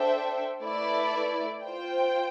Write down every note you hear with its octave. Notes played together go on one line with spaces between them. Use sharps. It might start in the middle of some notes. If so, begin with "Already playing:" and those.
Already playing: D4 A4 C5 E5 G5
A3 E4 B4 D5
F4 C5 G5